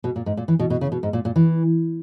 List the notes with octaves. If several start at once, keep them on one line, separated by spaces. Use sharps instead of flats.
B2
A#2
G#2
A#2
E3
B2
B2
C#3
B2
G#2
A#2
A#2
E3